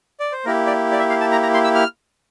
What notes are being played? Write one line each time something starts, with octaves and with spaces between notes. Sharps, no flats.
D5
C5
A#3 E4 G4 A#4
D5
D5
E5
F5
A5
A#5
A#5
C6
E6
F6